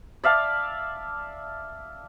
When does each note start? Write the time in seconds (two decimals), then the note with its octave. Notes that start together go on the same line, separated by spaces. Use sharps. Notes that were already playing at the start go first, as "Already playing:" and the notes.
0.24 D5 E5 F5 A5